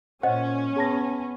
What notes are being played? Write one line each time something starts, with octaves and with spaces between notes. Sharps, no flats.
A#2 C#4 C5 D#5 F#5
B3 G#4 A5 A#6